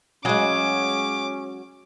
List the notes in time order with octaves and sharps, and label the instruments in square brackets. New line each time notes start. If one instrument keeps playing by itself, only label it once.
[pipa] C#3 G#4 [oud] F#3 G#3 [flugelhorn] C#4 [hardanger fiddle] D6